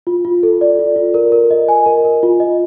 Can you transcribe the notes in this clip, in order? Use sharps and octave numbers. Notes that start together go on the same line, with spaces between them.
F4
F4
A4
D5
F4
F4
A#4
A#4
D#5
G#5
A#4
A#4
F4
D#5